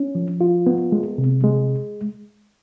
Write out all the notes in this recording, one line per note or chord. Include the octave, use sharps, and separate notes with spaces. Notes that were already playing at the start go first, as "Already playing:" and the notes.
Already playing: C#4
F3
F4
B3
G#3
C3
G#3